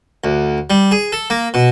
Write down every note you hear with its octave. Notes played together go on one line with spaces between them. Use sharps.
D2
G3
G#4
A4
A#3
B2